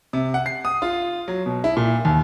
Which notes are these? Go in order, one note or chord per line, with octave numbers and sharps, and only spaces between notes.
C3
F#5
C7
D#6
F4
F#3
B2
E4
A#2
D#2